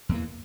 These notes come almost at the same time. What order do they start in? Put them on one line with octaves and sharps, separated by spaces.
E2 A#3 E3